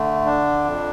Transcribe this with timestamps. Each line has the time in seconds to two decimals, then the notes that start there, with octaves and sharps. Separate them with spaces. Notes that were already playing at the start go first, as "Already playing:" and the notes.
Already playing: D3 A3
0.25 D4
0.64 F2